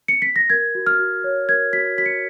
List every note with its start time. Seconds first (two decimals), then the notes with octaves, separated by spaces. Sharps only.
0.08 C#7
0.22 B6
0.36 A#6
0.50 A#4 G#6
0.75 F#4
0.87 F6
0.99 F#4
1.24 C#5
1.49 A#4 G#6
1.73 F#4 B6
1.98 F#4 B6
2.06 C#7